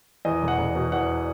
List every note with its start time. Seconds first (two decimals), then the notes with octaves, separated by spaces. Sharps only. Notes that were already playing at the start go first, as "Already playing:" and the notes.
0.25 E2 D#5
0.42 E1
0.48 F#5
0.58 E1
0.75 B2
0.92 E2 F#5